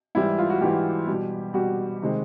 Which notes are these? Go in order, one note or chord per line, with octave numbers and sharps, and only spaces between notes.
G#2 E3 G3 E4
F4
F#4
G#2 E3 G3 G4
B2 G3
B2 G3 F#4
C3 D#3 G#3